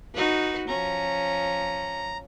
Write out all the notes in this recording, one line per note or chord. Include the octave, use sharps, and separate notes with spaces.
D#4 F#4 B4
F3 C#4 A#5